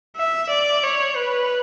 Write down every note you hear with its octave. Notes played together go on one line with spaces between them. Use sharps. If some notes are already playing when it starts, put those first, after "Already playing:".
E5
D5
C#5
B4